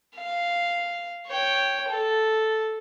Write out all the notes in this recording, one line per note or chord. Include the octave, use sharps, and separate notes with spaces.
F5
C#5 G5
A4